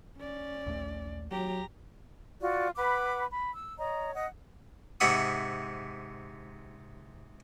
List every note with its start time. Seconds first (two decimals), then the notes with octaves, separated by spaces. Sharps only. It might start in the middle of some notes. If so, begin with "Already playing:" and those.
0.18 C#4 D5
0.66 A#1 D#2 A3
1.32 F#3 G4 A#5
2.41 F4 F#4 D5
2.76 B4 F#5 B5 D6
3.30 B5
3.54 E6
3.78 C#5 D#5 A#5
4.14 D#5 F#5
5.00 G#2 C3 E5 F#5 D#6